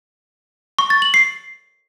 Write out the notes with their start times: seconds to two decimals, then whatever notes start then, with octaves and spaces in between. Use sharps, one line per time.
0.79 C#6
0.90 A6
1.02 F#7
1.14 C7